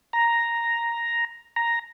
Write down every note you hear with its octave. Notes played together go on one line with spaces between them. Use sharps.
A#5
A#5